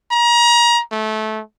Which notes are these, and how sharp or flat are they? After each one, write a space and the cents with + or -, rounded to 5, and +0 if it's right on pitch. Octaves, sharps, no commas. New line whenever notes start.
A#5 +30
A3 -20